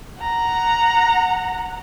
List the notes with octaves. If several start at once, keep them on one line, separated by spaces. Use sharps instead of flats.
F#5 A#5